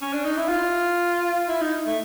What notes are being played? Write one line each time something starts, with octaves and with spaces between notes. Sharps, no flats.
C#4
D4
D#4
E4
F4
E4
D#4
A3